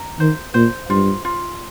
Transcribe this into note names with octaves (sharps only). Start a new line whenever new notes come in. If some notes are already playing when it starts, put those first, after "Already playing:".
Already playing: A#5
D#3 C5
A#2 C5
G2 F4
F4